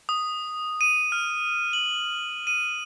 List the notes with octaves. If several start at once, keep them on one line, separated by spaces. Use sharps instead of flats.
D#6
D#7
F6
F#7
D#7